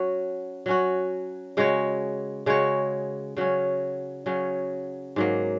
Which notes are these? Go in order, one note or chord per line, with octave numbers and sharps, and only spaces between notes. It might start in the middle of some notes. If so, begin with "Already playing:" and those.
Already playing: F#3 C#4 F#4
F#3 C#4 F#4
C#3 G#3 F#4 C#5
C#3 G#3 F#4 C#5
C#3 F#3 C#4
C#3 F#3 C#4
G#2 F#3 A#3